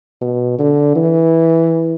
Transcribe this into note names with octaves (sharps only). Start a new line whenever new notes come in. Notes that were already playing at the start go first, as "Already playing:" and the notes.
B2
D3
E3